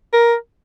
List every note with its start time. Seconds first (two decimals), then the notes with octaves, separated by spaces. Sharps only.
0.13 A#4